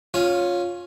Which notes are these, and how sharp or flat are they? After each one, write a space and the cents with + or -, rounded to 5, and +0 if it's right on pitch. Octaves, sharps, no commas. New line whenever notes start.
C#4 +0 F4 +15